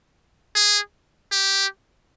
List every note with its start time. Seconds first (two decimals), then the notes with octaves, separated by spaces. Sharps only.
0.56 G#4
1.32 G4